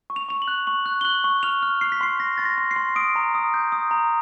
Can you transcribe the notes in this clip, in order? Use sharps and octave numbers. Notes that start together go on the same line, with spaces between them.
C#6
F7
C#6 F7
F#7
F#6
C#6 F#7
F#6
G7
F#6 F#7
C#6
F6 F7
F6
F6 C7
B6
C6 C7
C6 A#6
C6 A6
A#6
C6
C7
C6
D#6 D7
A#5
D#6
G6
D#6
A#5